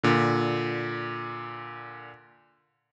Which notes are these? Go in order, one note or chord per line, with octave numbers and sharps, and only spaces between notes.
A#2 D3